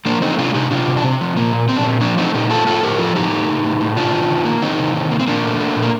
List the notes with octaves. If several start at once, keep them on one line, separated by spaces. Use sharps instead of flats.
F3 A#3 D4
A3 C4 D#4
C3 D4 F4
C3 D#4 G4
C3 D4 F4
C3
D4
C3 C4
F3
A#2 A#3
A#2
A#2 C4
D4
A#2 C4
F3 A#3 D4
A3 C4 D#4
A#2 D#4 G4
A3 F4 A4
A2 F4 A4
A2 G4 A#4
F3 F4 A4
A2 D#4 G4
A3
A2
A2
A2
C3 D4 F4
D#3
D#3
A#3
D#3 C4 D#4
C3
D#3
A#3
C4
A#2 A#3 D4
A3
A3
A#2
A#3